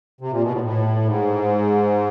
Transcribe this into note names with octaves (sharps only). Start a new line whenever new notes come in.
C3
A#2
B2
A2
A2
G#2